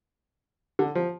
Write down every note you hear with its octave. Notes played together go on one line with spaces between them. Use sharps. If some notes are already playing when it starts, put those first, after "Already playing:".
D3
F3